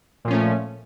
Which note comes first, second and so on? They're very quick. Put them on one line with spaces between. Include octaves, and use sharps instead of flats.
A#2 F3 C#4 A3